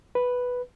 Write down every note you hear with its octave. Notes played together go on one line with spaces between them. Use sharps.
B4